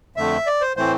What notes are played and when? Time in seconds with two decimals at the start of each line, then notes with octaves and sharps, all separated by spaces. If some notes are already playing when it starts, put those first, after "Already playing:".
0.16 F2 D3 A3 E5
0.46 D5
0.61 C5
0.76 A2 E3 A3 C4 C5